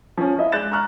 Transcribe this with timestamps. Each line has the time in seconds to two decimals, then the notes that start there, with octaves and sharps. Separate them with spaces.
0.17 F3 C#4
0.38 E4 D#5 E5
0.52 G#3 D5 F#6 G6 A6 E7
0.72 A#5 C#6 F6 F#6